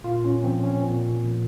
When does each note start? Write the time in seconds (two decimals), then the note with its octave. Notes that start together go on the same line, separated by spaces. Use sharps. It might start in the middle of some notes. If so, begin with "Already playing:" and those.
0.04 A#2 F4
0.24 C#4
0.44 F3 C4
0.64 C#4
0.83 A#2
1.23 F3